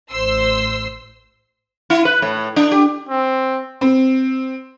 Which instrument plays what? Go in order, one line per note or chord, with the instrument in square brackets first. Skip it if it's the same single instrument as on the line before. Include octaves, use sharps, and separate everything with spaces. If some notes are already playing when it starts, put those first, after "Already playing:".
[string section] A1 C5 C6 E6
[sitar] E4
B4
A2
D4
G4
[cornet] C4
[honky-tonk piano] C4